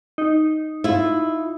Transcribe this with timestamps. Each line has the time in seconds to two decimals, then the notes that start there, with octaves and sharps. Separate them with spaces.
0.18 D#4
0.84 E4 F4